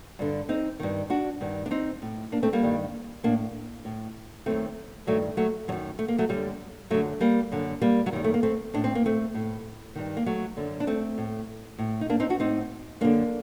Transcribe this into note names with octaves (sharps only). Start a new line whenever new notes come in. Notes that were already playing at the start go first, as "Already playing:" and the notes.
G2 D3
C4 D#4
G2 D#3
D4 F#4
G2 D#3
D4
C4 D#4
A2
A#3 D4
A3 C4
G3 A#3
G2 D#3
A2 A#3 D4
A2
F#2 D#3 A3 C4
G2 D#3 F#3 A3
F#3 A3
F#2 D#3 F#3
A3
A#3
F#3 A3
F#2 D3 G3
F#2 D3 F#3 A3
G3 A#3
F#2 D3
G3 A#3
F#3
F#2 D#3 G3
A3
A#3
A3 C4
A2 D4
C4
A#3
A3 C4
A2
G2 D#3
A#3
F#3 A3
F#2 D3
D4
A3 C4
A2
A2
D#4
A#3 D4
C4 D#4
D4 F#4
A2 C4 D#4
F#2 D3 A#3 D4